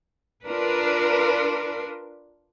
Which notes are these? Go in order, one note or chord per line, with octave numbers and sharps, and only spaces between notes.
D4 F4 A#4 B4